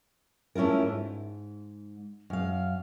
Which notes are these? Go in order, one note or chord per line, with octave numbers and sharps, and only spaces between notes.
A3 C#4 E4 F4 A#4
G#2
F#2 F5